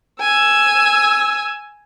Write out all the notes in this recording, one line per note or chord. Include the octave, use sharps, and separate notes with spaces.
G#5 E6